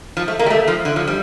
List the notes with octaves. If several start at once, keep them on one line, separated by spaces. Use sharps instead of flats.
F3
A3
A#3
G3
A3
F3
D3
F3
G3